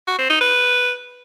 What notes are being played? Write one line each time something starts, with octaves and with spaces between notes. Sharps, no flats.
F#4
C4
D#4
B4